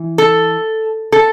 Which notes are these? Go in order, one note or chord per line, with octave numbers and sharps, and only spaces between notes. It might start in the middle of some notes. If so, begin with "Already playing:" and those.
Already playing: E3
A4
A4